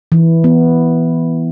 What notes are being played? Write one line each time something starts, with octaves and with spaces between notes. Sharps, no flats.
E3
B3